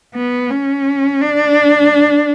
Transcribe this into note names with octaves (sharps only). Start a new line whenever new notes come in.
B3
C#4
D4